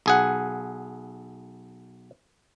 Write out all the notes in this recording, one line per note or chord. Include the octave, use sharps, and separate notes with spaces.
B1 G#4 F#5